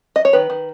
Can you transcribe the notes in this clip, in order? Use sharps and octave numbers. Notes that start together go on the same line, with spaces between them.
D#5
C#5
D#3 B4
D#3